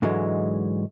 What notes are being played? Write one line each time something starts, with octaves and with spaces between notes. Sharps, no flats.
G#2 D3 E3 F#3 G#3